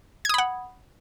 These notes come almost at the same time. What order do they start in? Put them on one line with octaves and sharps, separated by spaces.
G#6 D#6 B5 F#5